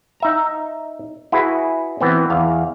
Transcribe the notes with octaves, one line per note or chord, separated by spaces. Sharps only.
D#4 E5 A#5
E4 F#4 G#4 B4
E3 B3 C4
E2 F5